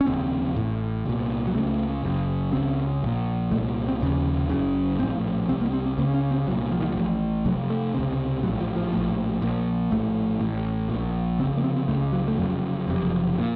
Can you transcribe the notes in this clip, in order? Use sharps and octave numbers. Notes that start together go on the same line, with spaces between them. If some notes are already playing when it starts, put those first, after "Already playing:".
C#4
F1 D#2 C#3 C4
A1 A2
C2 A#2
F#3
C#2 C#3 A3
F#1 F#2 C#3
C#2 C#3 C4
A#1 A#2
C2 A#2 A3
C4
F1 D#2 C#3
F#1 F#2 C#3
A#1 A2 C4
C2 C3 C4
A#3
C4
C4
C#2 C#3 A#3
C#4
C4
C2 A#2 F#3
F3
D#3
F3
A1 A2
F1 F2 C3 F#3
A3
C#2 C3
A#1 A2 F#3
F3
F3
A#1 A2
A#1 A#2
A#1 A2 A3
A1 A2
A#1 A#2
F1 D#2 C#3 C4
A#3
C4
C4
C#2 C#3 A3
F#3
A3
F1 F2 C#3 F#3
F#1 F2 C3
A#2